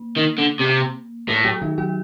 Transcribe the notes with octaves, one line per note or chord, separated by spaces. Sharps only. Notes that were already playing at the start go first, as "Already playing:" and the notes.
Already playing: A#3
D#3
D3
C3
A2 A3 A4
F#3 F#4
D#3 D#4
F#3 F#4